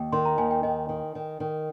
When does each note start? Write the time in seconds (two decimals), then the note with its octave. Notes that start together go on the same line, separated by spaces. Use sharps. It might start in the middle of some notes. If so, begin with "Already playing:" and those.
Already playing: D#2
0.12 D#3 C6
0.25 A#5
0.38 D#2 G#5
0.51 G5
0.63 D#3 D#5
0.89 D#3
1.15 D#3
1.40 D#3